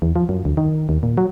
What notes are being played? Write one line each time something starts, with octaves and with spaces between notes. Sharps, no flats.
E2
F3
F#2
D2
D#3
D#2
A#2
F#3